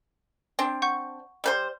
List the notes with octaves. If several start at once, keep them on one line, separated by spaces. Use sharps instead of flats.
C4 D4
F#5 C#6 G6
G3 B4 C5